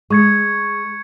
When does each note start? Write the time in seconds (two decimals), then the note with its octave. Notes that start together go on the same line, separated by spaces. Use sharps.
0.10 G#3 C#6 G#6 C#7